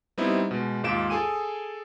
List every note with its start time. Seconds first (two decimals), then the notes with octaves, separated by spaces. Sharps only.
0.18 G3 B3 C4 D#4 E4
0.51 B2 G#3
0.84 D#2 G#2 F4 D7 E7
1.10 G#4 A4 G#5 D#7